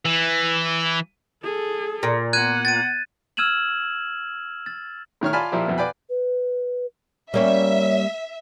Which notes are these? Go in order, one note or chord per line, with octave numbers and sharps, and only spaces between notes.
E3
G#4 A4
A#2
B3 F#5 F#6 G#6 D#7
A6 D#7
E6 F6 G#6 D#7 E7 F#7
A6
A2 D#3 C#5 F6
F4 D5 G#5 A5 B5 F6
A#2 F3 A#3 E4 G4
F2 B2 B3 E4
B4 D5 F5 G5 G#5 B5
B4
G3 A#3 C#4 C#5 E5